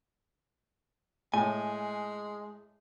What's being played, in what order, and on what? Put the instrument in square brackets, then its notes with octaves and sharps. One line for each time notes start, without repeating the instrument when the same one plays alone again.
[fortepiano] A2 [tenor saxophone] G#3 [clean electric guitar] G#5